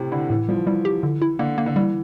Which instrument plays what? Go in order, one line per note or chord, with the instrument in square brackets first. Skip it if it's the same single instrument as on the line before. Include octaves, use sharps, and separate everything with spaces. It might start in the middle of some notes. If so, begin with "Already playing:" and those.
Already playing: [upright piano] A2 C3
[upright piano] D3 [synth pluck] E4
[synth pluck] A2 [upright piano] E3
[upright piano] F3 [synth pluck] G3
[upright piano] E3 [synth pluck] G3
[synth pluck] G4
D3
E4
[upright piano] D3 [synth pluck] A#3
[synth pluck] A#3
[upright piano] D3
[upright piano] E3 [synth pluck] G3